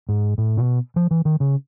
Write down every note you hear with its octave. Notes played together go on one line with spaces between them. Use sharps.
G#2
A2
B2
F3
E3
D#3
C#3